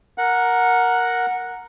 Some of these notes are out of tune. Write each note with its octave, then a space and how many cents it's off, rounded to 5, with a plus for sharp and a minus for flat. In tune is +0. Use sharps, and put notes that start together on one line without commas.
A#4 +0 F#5 -10